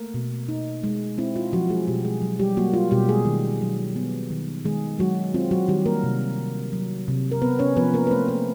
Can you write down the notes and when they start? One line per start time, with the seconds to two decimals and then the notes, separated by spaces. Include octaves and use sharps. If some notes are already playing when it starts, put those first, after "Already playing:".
Already playing: A3 A#3 A#4
0.14 B2
0.49 D#4
0.84 G#3
1.18 C4 E4
1.36 F4
1.52 F3 F#3 F#4
1.70 G#3 G#4
1.87 B2 G3 G4
2.05 G#3 G#4
2.22 F#3
2.39 G3 G4
2.57 F#3 A#3 F#4
2.74 F4
2.91 B2 G3 G4
3.09 G#3 G#4
3.26 D#3
3.61 F#3
3.96 B3
4.30 D#3
4.65 D#3 G#3 G#4
4.99 F#3 G#3 F#4
5.34 C4 F4
5.51 F#3 F#4
5.68 D#3 G3 G4
5.86 A#3 A#4
6.04 C3
6.38 D#3
6.73 F#3
7.08 C3
7.32 A#4
7.42 B3 C4 B4
7.59 C#4 C#5
7.77 F3 B3 B4
7.94 A#3 A#4
8.07 B4
8.11 A3 C4 C5
8.28 A#3 A#4